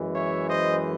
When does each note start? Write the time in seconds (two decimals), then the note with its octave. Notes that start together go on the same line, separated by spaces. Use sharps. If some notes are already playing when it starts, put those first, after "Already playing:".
Already playing: F#2 E3 G#3
0.16 C#5 E5
0.49 C5 D#5